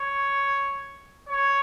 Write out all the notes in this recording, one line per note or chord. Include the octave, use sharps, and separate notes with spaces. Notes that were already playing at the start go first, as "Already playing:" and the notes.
Already playing: C#5
C#5